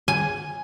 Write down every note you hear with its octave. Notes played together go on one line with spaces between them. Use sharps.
G#5